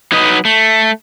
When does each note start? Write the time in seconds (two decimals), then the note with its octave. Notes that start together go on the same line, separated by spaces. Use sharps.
0.12 F#3 D#4 B4 D#5
0.45 A3